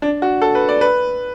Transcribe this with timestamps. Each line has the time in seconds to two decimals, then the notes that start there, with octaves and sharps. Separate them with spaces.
0.02 D4
0.22 F#4
0.42 A4
0.55 B4
0.69 D5
0.81 B4